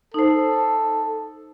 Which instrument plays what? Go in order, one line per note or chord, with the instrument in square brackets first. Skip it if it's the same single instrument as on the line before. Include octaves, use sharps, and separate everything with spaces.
[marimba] D#4 C5 [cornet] A4